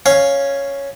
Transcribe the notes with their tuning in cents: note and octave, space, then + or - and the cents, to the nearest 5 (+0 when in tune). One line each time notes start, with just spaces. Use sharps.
C#4 +0 F5 +0